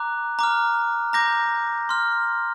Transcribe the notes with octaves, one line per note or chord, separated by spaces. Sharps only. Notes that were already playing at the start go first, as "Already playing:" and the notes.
Already playing: A#5 D6 F#6
A#5 D6 F6
A#5 D6 G6 A#6
C6 F6